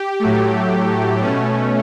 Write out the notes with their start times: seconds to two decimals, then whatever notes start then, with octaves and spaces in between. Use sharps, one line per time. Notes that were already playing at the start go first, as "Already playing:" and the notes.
Already playing: G4
0.20 A2 F#3 A3
1.20 B2 A3 C#4